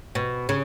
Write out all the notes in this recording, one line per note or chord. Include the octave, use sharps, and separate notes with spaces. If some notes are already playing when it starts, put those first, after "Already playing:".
B2
C#3